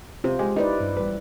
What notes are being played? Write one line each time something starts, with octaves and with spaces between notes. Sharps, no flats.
C3 F4 C5
G#3 G4
D#4 E4 B4 D5
G2
A1 G3 B4